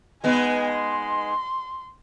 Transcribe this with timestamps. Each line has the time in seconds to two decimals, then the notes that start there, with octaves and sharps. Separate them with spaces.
0.24 G#3 B3 D#4 G#5
0.73 C6